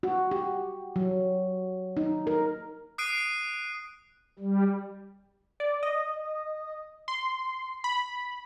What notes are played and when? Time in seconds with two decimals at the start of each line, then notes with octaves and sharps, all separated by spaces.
0.03 F#4
0.31 G4
0.96 F#3
1.97 D#4
2.27 A#4
2.98 D#6 F#6 C7 D7 D#7
4.39 G3
5.60 D5
5.83 D#5
7.08 C6
7.84 B5